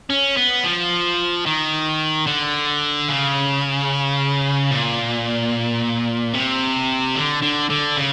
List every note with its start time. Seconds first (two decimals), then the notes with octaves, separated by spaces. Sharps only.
0.10 C#4
0.37 B3
0.65 F3
1.46 D#3
2.27 D3
3.08 C#3
4.71 A#2
6.34 C3
7.16 D3
7.42 D3
7.70 D3
7.97 C#3